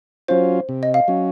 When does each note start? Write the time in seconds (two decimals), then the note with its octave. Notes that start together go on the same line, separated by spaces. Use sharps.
0.28 F#3 C#4 F4 C5
0.69 C3
0.83 D#5
0.94 F5
1.08 F#3 C#4